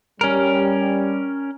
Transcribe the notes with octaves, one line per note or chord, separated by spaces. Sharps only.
G3 C#4 A#4